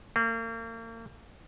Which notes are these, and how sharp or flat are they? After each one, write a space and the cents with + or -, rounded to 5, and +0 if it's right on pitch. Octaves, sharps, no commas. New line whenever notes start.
A#3 -40